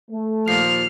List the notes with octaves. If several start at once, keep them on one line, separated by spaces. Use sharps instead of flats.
A3
D#2 A#2 F3 F6 C7